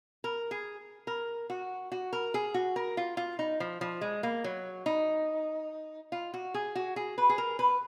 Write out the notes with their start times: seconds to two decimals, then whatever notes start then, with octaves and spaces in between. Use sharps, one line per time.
0.24 A#4
0.51 G#4
1.07 A#4
1.50 F#4
1.92 F#4
2.13 A#4
2.34 G#4
2.54 F#4
2.76 A#4
2.97 F4
3.17 F4
3.39 D#4
3.60 F3
3.81 F3
4.01 G#3
4.23 A#3
4.44 F#3
4.86 D#4
6.12 F4
6.34 F#4
6.54 G#4
6.75 F#4
6.96 G#4
7.18 B4
7.29 G#4
7.38 A#4
7.59 B4